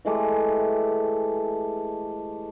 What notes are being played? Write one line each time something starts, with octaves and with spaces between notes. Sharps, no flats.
E3 G#3 A3 G4